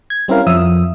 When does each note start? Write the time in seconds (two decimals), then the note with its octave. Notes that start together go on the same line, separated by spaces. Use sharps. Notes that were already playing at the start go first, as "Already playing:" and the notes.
0.10 G#6
0.28 G3 C4 C#4 E4 A#4 F5
0.47 F2 F3 E5 D#6 E6